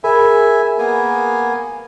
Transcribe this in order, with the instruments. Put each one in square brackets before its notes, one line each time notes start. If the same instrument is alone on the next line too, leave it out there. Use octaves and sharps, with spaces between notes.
[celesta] G#4 A#4 B5 [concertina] E5 G#5
[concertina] A#3 B3 G#5